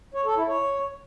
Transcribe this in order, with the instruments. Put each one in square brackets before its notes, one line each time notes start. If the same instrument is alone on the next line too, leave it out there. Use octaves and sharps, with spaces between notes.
[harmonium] C#5
A4
E4
C#5